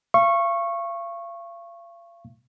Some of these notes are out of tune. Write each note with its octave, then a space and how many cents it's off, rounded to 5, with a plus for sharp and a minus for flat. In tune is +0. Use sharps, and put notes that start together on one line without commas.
F5 -40 C#6 -15